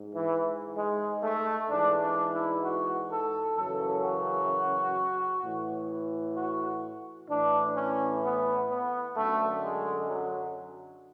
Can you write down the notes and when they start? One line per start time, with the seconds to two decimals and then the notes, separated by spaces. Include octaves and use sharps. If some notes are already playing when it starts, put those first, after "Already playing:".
Already playing: G#2
0.15 E3
0.77 G#3
1.23 A3
1.70 G#2 E3 D4
2.01 D4
2.32 E4
2.63 F#4
3.10 A4
3.56 F#2 C#3 E3 A4
4.03 F#4
5.42 A2 E3
6.35 F#4
7.29 A2 E3 D4
7.75 C#4
8.22 B3
8.68 B3
9.15 F#2 D3 A3
9.62 G#3
10.08 F#3